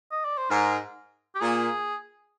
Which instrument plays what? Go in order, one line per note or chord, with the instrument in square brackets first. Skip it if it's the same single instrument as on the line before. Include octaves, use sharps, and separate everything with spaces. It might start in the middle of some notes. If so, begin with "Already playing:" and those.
[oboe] D#5
D5
C5
[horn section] G#2 [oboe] A#4
[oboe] G4
[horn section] A#2 [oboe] G#4